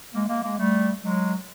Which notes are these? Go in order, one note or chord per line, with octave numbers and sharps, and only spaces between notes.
G#3 A#3
G#3 A#3
G#3 A#3
G3 A3
F#3 G#3